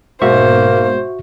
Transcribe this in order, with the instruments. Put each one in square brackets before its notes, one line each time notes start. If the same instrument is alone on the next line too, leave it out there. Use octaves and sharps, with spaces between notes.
[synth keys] G#2 B2 [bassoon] A#3 [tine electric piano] F#4 E5 C#6 [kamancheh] C5